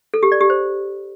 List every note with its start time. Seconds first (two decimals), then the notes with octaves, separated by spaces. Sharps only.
0.14 A4
0.23 G4
0.32 D5
0.41 G4
0.50 C5